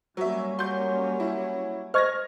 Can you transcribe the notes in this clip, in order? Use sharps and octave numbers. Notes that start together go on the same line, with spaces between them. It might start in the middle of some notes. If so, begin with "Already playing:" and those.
F#3 G3 A#3 C#4 E5
F#3 C6 G6
E4
C5 D#5 C#6 F6 G#6 A#6